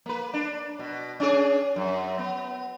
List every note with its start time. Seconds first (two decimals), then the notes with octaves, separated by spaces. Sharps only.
0.06 A#3 B4
0.34 D4
0.79 B2
1.20 C#4 D4 G#4
1.76 F#2
2.19 B3